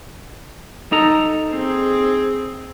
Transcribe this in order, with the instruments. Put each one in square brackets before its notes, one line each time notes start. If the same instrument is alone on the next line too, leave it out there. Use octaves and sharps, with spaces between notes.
[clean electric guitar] D#4 A4 A#5
[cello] C4 G#4